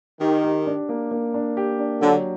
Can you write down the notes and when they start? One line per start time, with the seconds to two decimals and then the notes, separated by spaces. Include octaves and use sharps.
0.21 D#3 G4
0.44 G4
0.66 D4
0.89 A#3
1.11 A#3
1.34 D4
1.57 G4
1.79 D4
2.01 D3 F#3